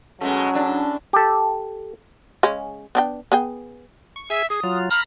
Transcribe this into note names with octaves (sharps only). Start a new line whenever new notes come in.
B2 F#3 G#3 A3 C#4
A2 D4
G4 A4
C#3 G#3 C#4
B3 D4 G5
B3 G#4 G5
C#6
G#4 E5 G#5
G#4 D#6
F#3 F4
A#5 B5 F6